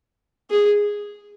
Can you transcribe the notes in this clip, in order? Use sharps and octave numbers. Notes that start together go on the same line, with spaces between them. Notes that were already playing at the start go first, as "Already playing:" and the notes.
G#4